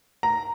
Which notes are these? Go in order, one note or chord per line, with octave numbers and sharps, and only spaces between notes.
A#5